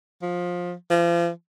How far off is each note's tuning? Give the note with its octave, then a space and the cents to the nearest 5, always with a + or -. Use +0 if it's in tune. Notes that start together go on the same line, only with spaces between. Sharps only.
F3 +20
F3 -35